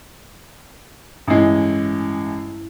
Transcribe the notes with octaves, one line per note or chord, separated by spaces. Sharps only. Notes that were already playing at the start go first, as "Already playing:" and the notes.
A1 G2 G#3 E4